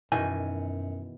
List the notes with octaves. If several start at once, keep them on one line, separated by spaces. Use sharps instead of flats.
F#2 B2 D#3 E3 G#5